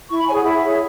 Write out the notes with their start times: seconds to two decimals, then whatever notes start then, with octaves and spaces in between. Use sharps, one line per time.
0.09 E4 C#6
0.18 B5
0.27 C#5 G#5
0.32 G#4 F#5
0.44 E4 E5
0.62 G#4 C#5